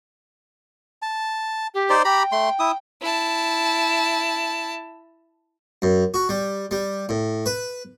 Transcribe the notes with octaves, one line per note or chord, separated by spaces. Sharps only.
A5
G4
D#4 C5 D5
G4 G5 A#5 B5
A3 C6
E4 D#6
E4 A5
F#2
F#4
G3
G3
A2
B4